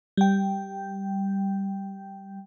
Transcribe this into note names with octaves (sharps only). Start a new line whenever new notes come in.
G3 G5